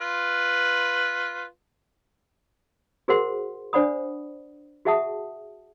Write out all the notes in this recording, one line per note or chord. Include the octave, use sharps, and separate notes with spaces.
F4 B4
F#4 G#4 A#4 C5 F#5 C6
D4 C5 D5 F#5 B5 D#6
F#4 G#4 E5 F#5 A5 D#6